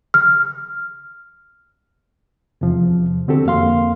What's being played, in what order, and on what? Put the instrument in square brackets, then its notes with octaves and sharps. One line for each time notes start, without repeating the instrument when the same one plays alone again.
[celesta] F6
[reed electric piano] E2 C3 F3
D3 C4 F#4 G4 A4
F2 A#3 F5 C6